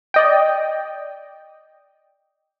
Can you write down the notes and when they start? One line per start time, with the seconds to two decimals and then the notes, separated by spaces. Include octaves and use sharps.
0.14 D5 D#5 G5